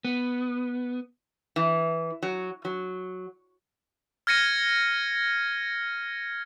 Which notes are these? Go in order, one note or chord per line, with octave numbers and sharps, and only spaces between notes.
B3
E3
F#3
F#3
F6 G#6 A#6 C#7 D#7